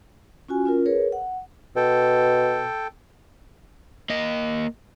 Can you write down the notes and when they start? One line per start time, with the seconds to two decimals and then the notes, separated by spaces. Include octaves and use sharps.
0.49 C#4 F4 F#4 G#5
0.65 C#4 F4 A#4
0.86 G#4 A#4 B4 C#5
1.12 F#5
1.76 B2 A4 G5
4.10 A#3 D#5